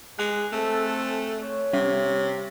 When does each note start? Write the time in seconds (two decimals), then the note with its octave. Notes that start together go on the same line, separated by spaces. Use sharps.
0.19 G#3 G#5 F#6
0.53 A3 C4 A4
1.40 C#5
1.73 C3 G3